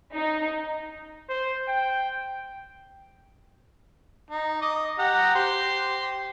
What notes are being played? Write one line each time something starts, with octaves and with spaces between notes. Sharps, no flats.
D#4
C5
G5
D#4
D#5 D6 D#6
G4 F#5 A#5
G4 C5 C6